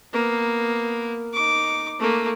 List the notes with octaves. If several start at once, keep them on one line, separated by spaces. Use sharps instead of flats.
A#3 B3
D#4 D6
A3 A#3